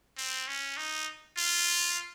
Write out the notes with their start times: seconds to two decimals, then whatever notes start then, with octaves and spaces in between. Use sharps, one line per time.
0.17 C4
0.48 C#4
0.77 D#4
1.37 F4